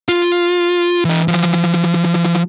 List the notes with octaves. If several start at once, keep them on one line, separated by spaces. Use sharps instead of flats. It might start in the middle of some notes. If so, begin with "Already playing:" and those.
F4
E3 D#5
E3 F3